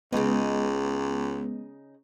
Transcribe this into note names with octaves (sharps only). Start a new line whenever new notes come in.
C#2 C#3 G#3 B3 D#4